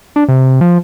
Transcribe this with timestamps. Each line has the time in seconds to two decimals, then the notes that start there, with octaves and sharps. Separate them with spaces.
0.16 D4
0.29 C3
0.61 F3